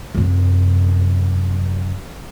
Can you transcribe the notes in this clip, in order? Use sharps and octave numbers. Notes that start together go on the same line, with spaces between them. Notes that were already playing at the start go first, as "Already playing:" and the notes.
F#2 C3